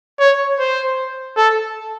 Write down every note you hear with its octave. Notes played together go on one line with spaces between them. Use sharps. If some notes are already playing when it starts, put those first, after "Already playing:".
C#5
C5
A4